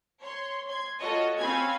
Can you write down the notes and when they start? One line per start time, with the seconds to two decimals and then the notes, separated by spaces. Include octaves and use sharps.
0.21 C#5 C6
0.67 C6 G#6
0.99 F4 F#4 A4 C#5 D#5
1.38 C4 C#4 F5 G#5 B5 G#6